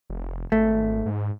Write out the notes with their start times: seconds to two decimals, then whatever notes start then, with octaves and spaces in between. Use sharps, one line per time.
0.10 F1
0.52 G#1 A3
1.06 G#2